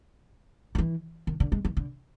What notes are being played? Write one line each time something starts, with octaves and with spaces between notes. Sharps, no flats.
D#3
E3
D#3
D3
G#3
E3
D3